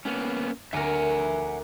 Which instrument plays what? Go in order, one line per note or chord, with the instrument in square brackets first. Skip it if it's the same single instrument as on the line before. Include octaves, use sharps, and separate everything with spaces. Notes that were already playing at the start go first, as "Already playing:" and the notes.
[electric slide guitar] A#3 B3 C#4
[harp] D2 A#4 [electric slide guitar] E5 F#5 G#5